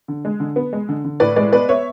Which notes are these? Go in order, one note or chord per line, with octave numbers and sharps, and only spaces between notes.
D3
G#3
D3
B3
G#3
D3
D3
A2 B4 D5
G#3 B4 D5
B3 B4 D5
B3 C#5 E5